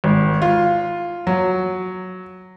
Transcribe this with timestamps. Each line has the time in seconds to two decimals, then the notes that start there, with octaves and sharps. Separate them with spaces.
0.04 G#1
0.42 F4
1.27 F#3